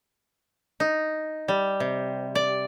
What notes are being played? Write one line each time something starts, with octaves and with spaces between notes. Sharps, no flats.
D#4
G3
C3
D5